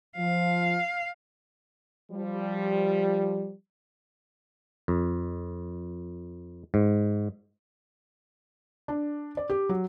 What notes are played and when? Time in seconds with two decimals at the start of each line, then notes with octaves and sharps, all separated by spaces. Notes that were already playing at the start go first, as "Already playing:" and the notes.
0.17 F3 F5
2.11 F3 G3
4.88 F2
6.74 G#2
8.88 D4
9.37 D5
9.50 G4
9.69 F#3